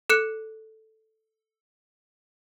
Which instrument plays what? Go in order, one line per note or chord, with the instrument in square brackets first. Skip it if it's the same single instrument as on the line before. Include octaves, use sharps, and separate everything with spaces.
[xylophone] A4 F#6 C#7